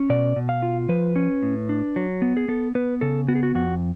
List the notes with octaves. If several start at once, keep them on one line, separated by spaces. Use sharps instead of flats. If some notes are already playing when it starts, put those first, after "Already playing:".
Already playing: C#4
B2 D5
B2
F5
F4
F3 B4
C#4
A2
D4
F#3
B3
G#4
B3 A4
B3 B4
C#3 A4
B3 F#4
G#4
F#4
F2 F#4